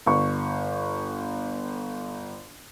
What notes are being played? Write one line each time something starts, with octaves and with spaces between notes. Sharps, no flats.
G1 C#6